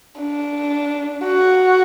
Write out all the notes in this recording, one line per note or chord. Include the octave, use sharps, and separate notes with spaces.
D4
F#4